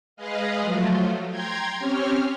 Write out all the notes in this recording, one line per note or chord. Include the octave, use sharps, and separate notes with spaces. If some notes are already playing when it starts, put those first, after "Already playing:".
G#3 G#4 B4 D#5 F5
F3 F#3 A3 F4
G5 A#5 C6 G#6
C4 C#4 G4 C#5 F6